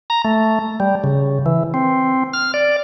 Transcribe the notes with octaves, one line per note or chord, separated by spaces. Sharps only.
A#5
A3
G3
C#3
E3
C4
F6
D5